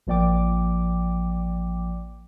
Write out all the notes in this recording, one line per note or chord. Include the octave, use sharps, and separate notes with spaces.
A1 F3 A#3 D5 G5 D6